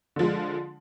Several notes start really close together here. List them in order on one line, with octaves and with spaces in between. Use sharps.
D3 F3 G#3